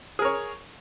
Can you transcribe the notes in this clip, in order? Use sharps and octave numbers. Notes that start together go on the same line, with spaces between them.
G#4 A#4 C#5